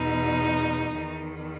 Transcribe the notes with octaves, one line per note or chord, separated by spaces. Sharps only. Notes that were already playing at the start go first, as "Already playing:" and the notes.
Already playing: E2 B2 D#4
E2 D#3